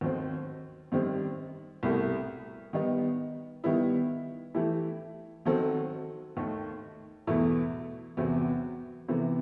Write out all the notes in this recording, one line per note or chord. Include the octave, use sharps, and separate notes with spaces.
D#2 D#3 F#3 C4
F#2 D#3 G3 C4
C2 B2 A3 E4 G4
D#3 G3 B3 D#4
D#3 G3 B3 E4
E3 A3 E4 G4
D#3 F#3 C4 F#4 A4
D#2 D#3 A3
E2 B2 A3 E4 A4
E2 C3 F#3 B3 F#4
C3 E3 B3